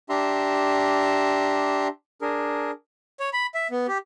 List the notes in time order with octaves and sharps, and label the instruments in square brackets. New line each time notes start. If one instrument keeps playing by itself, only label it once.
[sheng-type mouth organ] D4 G4 E5 A#5 C6
D4 G#4 A#4
C#5
B5
E5
B3
G4